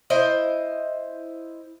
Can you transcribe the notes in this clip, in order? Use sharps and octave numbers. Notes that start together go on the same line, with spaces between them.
E4 C5 D#5